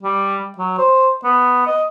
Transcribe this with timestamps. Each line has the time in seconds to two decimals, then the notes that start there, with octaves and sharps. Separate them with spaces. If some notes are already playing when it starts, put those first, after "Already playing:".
0.03 G3
0.58 F#3
0.78 C5
1.24 B3
1.67 D#5